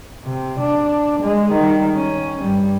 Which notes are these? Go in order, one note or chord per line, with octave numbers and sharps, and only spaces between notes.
C3
D4
G#3
D#3 G3
C#4
G2 G3